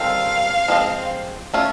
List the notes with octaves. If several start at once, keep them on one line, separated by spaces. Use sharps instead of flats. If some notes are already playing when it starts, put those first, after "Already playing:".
Already playing: D#3 G3 C4 F4 A4 F5
F3 G#3 C4
A3 C#4 F4 A4